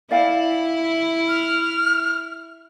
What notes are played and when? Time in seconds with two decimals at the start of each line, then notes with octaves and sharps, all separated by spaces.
0.11 E4 D5 F5 G5
1.28 F6